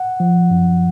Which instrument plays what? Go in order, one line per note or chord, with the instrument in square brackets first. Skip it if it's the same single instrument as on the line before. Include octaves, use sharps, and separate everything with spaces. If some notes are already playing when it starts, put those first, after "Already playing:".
Already playing: [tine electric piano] F#5
F3
F#2